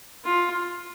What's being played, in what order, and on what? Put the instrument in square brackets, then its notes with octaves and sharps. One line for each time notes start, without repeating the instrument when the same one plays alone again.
[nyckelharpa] F4